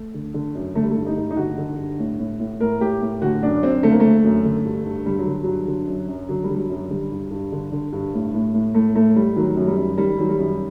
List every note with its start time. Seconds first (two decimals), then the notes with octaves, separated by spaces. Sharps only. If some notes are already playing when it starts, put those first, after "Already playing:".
Already playing: A3
0.14 D3
0.34 D3
0.55 F#2
0.75 D3 A3
0.83 G3
0.91 A3
0.97 G2
1.06 D#4
1.16 G2
1.31 D#4
1.37 D3 F#4
1.58 D3
1.78 G2
1.99 A2
2.19 A2
2.40 A2
2.60 A2 A#4
2.80 A2 G4
3.01 A2
3.22 D3 F#4
3.43 F#2 D4
3.63 F#2 C4
3.83 D3 A3
3.91 A#3
4.00 D3 A3
4.24 F#2
4.45 D3
4.65 G2
4.86 G2
5.06 D3 G3
5.19 F#3
5.26 D3
5.44 G2 F#3
5.67 D3
5.87 F#2
6.09 F#2
6.29 D3 F#3
6.44 G3
6.49 D3
6.55 G3
6.59 F#3
6.70 F#2
6.76 F#3
6.90 D3 G3
7.12 G2
7.31 G2
7.52 D3
7.72 D3
7.93 G2
8.14 A2
8.34 A2
8.54 A2
8.74 A2 A3
8.95 A2 A3
9.16 A2 G3
9.36 D#3 F#3
9.57 F#2
9.67 G3
9.77 F#2
9.97 D#3 G3
10.18 D#3 F#3
10.29 G3
10.39 F#2